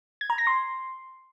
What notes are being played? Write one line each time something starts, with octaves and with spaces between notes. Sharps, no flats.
G#6
A#5
A#6
C6